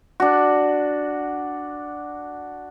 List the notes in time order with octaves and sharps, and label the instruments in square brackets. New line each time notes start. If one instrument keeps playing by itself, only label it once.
[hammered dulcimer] D4 F#4